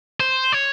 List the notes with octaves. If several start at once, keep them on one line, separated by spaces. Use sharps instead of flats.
C5
C#5